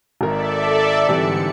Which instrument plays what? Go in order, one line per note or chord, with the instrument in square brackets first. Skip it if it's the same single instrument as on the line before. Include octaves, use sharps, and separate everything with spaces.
[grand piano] G#1 A#4 [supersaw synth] A4 D5 E5
[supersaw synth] G#2 D3 C#7 [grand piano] E3 G3 C4